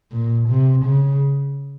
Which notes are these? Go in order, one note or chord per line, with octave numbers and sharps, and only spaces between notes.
A#2
C3
C#3